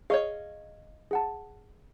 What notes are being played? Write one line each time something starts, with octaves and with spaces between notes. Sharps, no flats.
G#4 C#5 D#5 F5 C#6
G#4 F#5 A5